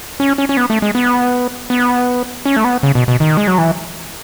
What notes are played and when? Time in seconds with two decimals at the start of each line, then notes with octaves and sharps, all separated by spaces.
0.20 C#4
0.38 C#4
0.49 C#4
0.57 B3
0.70 A3
0.82 G#3
0.95 B3
1.70 B3
2.45 C#4
2.56 A3
2.64 B3
2.83 C#3
2.95 B2
3.08 B2
3.20 D#3
3.37 G#3
3.47 F#3
3.58 E3